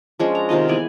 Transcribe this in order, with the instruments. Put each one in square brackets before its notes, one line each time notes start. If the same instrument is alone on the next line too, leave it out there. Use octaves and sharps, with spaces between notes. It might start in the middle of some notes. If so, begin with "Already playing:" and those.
[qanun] F3 G#3 C#4 D4
A#5
C3 D#3 F4 D#5
E3 B3 D5 G#5